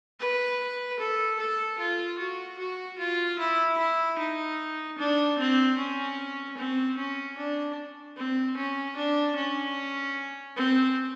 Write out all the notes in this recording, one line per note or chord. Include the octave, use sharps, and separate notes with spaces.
B4
A4
A4
F4
F#4
F#4
F4
E4
E4
D#4
D4
C4
C#4
C4
C#4
D4
C4
C#4
D4
C#4
C4